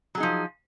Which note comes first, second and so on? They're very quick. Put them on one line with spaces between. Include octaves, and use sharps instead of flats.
F#3 G#4 D#4 F3